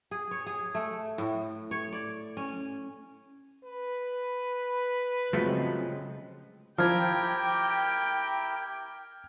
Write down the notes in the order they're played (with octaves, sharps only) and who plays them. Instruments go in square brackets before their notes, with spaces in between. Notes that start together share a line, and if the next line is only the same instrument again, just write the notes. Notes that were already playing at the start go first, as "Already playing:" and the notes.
[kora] G#4
C#5
G#4
A3
A2
C#5
D5
C#4
[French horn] B4
[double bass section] C#3 G#3 C4 [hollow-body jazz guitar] F3 F#3 A3
[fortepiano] F3 [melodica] E4 G4 A#4 [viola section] G5 [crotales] F6 G#6